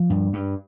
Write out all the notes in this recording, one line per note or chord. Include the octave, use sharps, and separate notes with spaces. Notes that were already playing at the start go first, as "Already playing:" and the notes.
Already playing: F3
G2
G2